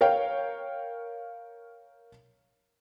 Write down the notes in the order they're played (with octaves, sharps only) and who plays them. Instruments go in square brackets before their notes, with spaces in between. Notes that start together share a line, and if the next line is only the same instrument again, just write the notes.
[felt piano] A#4 C#5 F5 G5